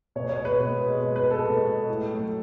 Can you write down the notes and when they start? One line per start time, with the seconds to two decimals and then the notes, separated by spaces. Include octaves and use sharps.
0.16 B2 C#5
0.29 C#5
0.37 G#3
0.45 B4
0.59 B2
0.80 G#3
1.01 B2
1.16 B4
1.23 G#3
1.31 A4
1.46 B2
1.67 G#3
1.89 A2
2.10 F#3 A3